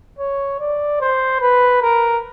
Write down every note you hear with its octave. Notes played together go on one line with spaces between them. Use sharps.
C#5
D5
C5
B4
A#4